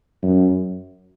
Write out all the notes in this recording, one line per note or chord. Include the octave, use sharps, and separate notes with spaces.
F#2